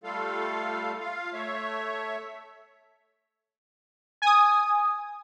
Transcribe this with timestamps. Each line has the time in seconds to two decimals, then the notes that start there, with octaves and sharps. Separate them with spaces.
0.04 G3 A3 F4 A4 F5
1.00 F4 F5
1.33 A3 C#5 E5
4.22 G#5 D#6